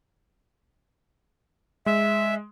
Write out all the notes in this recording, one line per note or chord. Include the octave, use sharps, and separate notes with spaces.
G#3 E5